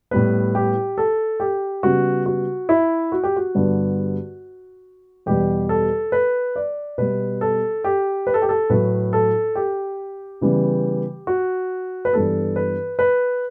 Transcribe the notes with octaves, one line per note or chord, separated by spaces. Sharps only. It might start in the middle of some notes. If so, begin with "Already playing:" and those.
A2 G3 B3 B4
G4
A4
G4
C#3 G3 B3 F#4
F#4
E4
F#4
G4
F#4
G2 D3 G3 B3
E2 B2 G3 G4
A4
B4
D5
B2 G3 B3 B4
A4
G4
B4
A4
G4
A4
A2 F#3 A3 B4
A4
G4
C#3 E3 G3 B3
F#4
B4
G2 E3 B3 A4
B4
B4